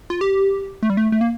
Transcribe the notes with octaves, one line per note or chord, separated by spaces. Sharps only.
F4
G4
A3
G3
A3
A3
A#3